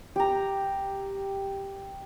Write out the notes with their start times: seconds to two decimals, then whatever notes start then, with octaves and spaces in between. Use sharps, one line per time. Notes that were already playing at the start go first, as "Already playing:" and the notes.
0.16 G4 A#5